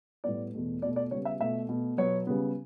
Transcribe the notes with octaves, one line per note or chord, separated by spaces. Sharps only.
A2 G3 B3 D5
E2 B2 A3
B2 A3 D5
D5
C#3 G3 B3 C#5
E5
B2 A3 E5
B2 A3
B2 F#3 B3 C#5
C#3 G3 B3